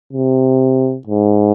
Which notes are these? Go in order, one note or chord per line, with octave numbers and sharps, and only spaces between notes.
C3
G#2